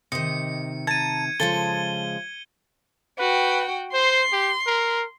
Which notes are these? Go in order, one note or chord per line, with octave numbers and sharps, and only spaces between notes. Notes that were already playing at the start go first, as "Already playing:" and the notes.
C3 D#3 D#5 C#7
A5 A#5 G#6 D#7
C#3 F3 G#3 A4 A5 G7
F#4 B4 G5
C5 C6
G4
A#4